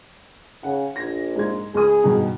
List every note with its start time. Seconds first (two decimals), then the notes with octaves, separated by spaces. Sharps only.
0.63 C#3 F#5
0.96 A#1 G#6 A#6
1.36 G#2 G#3 G#6
1.75 C#2 G#4 D#6
2.04 G2 B2 D#3